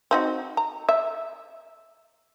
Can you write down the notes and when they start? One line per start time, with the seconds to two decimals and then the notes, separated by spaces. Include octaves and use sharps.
0.11 C4 D#4 F#4
0.57 A#5
0.89 E5